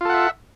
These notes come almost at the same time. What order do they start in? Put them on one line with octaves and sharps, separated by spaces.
F4 A4 F#5 E5